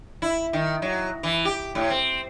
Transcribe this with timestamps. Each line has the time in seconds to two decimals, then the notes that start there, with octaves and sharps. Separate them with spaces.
0.22 E4
0.53 D#3
0.82 F#3
1.23 E3
1.45 G4
1.75 A2
1.90 C4